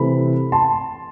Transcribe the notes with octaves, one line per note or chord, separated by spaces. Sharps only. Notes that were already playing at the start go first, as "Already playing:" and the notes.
Already playing: C3 E3 A3 C4 B5
A5 C6